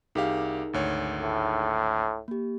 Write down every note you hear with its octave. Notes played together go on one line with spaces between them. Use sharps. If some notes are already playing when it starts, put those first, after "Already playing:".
C2 D#4 G4 G#4 A#4 F5
G#1 D2 C#5
A2
A#3 G4